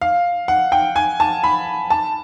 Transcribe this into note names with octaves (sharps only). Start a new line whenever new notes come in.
F5
F#5
G5
G#5
A5
B5
A5